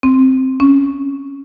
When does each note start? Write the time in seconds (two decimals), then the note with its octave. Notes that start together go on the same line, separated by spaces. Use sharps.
0.03 C4
0.60 C#4